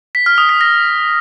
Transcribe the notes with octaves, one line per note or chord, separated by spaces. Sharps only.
B6
F6
D#6
B6
A#6